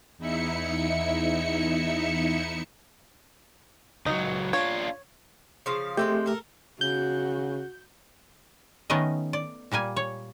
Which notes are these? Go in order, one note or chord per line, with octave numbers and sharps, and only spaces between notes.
E2 D#4 E4 E5 C#7
C#2 F#3 D#4
D4 F4 C#5
C#3 F3 F5
G#3 A3 C4 G4 G5
A4 A#4
C#3 F#4 G6
D#3 A3 B3 C#4 A#4 D#5
D5
A#2 G3 A#3 G#5
C#5